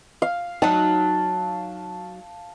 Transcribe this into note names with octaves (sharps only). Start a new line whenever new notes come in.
F5
F#3 D#4 A5